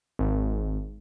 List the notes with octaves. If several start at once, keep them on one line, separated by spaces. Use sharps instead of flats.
G#1